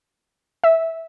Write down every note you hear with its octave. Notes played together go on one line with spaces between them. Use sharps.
E5